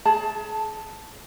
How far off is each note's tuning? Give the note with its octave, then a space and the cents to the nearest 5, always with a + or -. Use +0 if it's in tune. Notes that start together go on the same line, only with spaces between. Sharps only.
G#4 +35 A5 +0